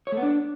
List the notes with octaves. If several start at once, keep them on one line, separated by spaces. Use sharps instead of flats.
C#5
A3
B3
D4